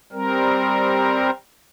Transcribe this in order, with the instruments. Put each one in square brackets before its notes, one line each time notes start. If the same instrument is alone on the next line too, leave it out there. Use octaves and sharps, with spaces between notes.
[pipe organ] G3 C4 A#4